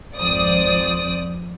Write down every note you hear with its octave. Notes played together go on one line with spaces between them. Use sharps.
G#1 F2 C5 D5 D#6